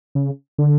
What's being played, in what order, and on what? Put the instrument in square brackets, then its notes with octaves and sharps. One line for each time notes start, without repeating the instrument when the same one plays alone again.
[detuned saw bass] C#3
D3